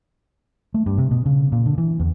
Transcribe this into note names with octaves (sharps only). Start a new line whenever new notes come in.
A3
G2
C3
B2
C#3
A#2
D3
E3
E2